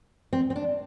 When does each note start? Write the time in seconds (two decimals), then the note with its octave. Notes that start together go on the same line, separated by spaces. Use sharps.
0.33 C4
0.50 C4
0.56 D4